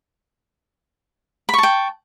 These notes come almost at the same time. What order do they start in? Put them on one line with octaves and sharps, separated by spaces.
B5 C#6 A5 G5